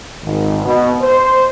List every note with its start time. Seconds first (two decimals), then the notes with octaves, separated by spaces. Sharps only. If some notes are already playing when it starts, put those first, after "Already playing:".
0.23 G#1
0.65 B2
1.01 C5